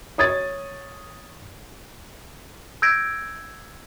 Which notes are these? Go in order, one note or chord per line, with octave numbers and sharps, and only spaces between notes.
C#5 D#6 G#6 A6
E6 G6 G#6 A#6 D7